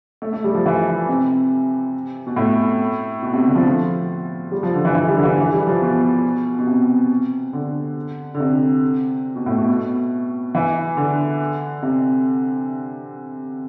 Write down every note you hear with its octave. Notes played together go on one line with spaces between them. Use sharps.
A3
A3
G3
F3
E3
C3
B2
A2
B2
C3
D3
F3
F3
G3
F3
D3
E3
E3
G3
D3
E3
E3
G3
F3
B2
B2
C3
D3
D3
C3
B2
A2
B2
B2
E3
D3
C3